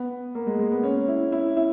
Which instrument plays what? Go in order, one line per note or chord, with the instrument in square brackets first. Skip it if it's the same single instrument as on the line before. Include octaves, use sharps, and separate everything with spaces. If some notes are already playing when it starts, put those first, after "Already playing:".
Already playing: [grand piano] B3
A#3
G#3
G#3
B3
C#4
E4
E4
E4